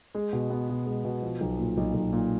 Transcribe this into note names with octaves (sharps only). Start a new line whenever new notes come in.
G#3
B2
B3
B2
G#3
B2
F3
B1
A#2
B1
B1
A#2